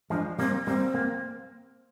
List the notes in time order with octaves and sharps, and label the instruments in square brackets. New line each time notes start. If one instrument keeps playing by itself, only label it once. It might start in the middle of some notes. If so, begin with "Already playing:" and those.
[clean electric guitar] F3 G#3 [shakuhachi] D4
[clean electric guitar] G3 A#3 [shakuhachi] C4
[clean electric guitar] G3 A#3 [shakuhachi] C4
[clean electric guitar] A#3